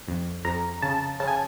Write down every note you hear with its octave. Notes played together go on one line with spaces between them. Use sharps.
F2
F2 A#5
C#3 A5
C#3 A5
G#5